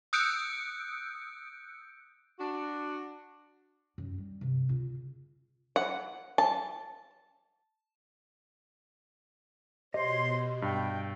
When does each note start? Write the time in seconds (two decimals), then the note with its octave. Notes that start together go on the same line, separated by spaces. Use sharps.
0.13 D#6 E6 F#6 G6 C#7 D7
2.39 D4 F#4
3.98 F#2
4.18 G3
4.41 G2 C3
4.69 C#3 F4
5.76 F#5
6.38 A5
9.94 B2 G4 C5 C#5 D#5 C6
10.62 G2 G5